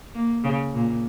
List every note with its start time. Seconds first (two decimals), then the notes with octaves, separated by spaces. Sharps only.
0.15 A#3
0.44 C#3
0.74 A#2